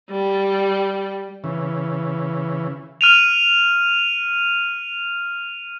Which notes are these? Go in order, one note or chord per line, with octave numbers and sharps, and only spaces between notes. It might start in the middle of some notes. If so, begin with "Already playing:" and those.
G3
C#3 E3
F6 D#7 F7